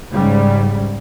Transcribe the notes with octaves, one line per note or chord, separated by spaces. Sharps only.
G#2 C#3 G3